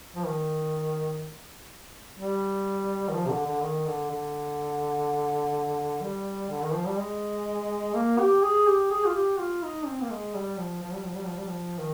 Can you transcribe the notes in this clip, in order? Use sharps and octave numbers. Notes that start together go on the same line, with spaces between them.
F3
D#3
G3
D#3
F3
C3
D3
D3
D#3
D3
D3
G3
D3
D#3
F3
G3
G#3
A#3
G4
G#4
G4
G#4
F4
G4
F4
D#4
C4
A#3
G#3
G3
F3
F3
G3
F3
G3
F3
G3
F3
D#3